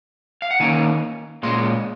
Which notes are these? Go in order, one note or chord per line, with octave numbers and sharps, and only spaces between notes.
F5
F#5
D#3 A#3 C#4 G#5
A#2 G#3 C#4 C6